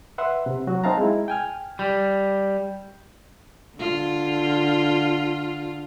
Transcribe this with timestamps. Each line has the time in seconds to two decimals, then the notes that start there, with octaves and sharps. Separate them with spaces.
0.18 B4 E5 F#5 C6
0.46 C3
0.67 F#3 F#4
0.84 C4 D#4 F5 A5 A#5
0.97 G#3 E4
1.28 G5 G#5 F6
1.79 G3
3.76 D3 F4